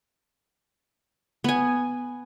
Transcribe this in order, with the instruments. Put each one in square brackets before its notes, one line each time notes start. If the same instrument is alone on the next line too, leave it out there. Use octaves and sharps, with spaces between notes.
[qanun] B3 G#5